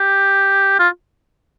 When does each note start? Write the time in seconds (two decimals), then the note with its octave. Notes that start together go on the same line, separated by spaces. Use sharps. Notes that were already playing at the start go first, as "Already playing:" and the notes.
Already playing: G4
0.79 F4